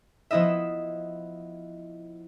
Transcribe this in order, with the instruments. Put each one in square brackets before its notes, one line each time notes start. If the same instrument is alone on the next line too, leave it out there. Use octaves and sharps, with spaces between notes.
[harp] F3 B3 E4 D#5 E5